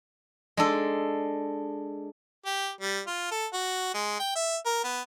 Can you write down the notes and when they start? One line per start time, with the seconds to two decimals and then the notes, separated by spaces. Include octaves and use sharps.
0.57 G#3 D4 A4
2.46 G4
2.81 G3
3.07 F4
3.31 A4
3.53 F#4
3.94 G#3
4.19 G5
4.35 E5
4.66 A#4
4.84 B3